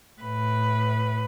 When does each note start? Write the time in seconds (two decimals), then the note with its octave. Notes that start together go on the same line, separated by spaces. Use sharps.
0.20 A2 B4